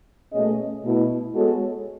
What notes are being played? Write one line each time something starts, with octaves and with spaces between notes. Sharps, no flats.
B2 A3 C#4 G#4 D#5
B2 A3 E4
G#3 B3 F#4 A4 C#5